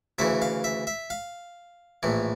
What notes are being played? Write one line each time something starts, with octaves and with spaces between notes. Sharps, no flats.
D2 C#3 E3 E5
F5
E5
E5
F5
A#1 A2 E3